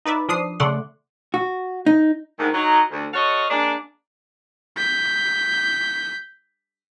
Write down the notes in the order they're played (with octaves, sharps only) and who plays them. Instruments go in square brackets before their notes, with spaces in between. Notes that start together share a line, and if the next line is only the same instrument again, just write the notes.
[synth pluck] D#4 B4 D5 E5
F3 D4 D#6 C7
C#3 A3 D5 F#5 C6
[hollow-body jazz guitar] F#4
D#4
[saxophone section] D2 G#2 D#3
F#3 D#4
D2
F#4 A4 C#5 D#5 F5
G#3 A#3 D4
[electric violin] G6 B6